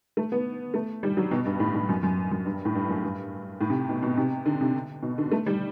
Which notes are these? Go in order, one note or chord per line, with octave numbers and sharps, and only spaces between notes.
A3
B3
A3
G3
F#3
B2
G2
A2
A2
F#2
F#2
F#2
G2
A2
G2
F#2
G2
A2
C3
B2
B2
C3
D3
C3
B2
D3
A3
G3